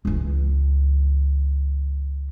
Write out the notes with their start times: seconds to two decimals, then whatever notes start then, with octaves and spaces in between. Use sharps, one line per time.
0.05 C#2 E3